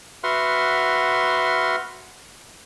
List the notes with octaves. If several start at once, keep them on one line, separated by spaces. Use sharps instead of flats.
F#4 B4 E5 F#5 C6 F6